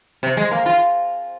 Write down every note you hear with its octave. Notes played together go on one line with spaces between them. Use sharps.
C3
G#3
A#3
F4